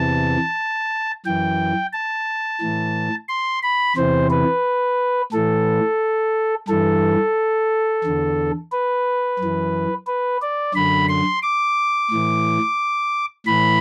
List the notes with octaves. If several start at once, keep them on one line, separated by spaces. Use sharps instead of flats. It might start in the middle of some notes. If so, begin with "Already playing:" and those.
Already playing: E2 C3 E3 A5
F#2 E3 G5
A5
A2 E3
C6
B5
E2 C3 E3 C5
B4
A2 E3 A4
G2 E3 A4
E2 D3
B4
F#2 E3
B4
D5
F#2 D3 B5
C6
D6
A2 E3
A2 E3 B5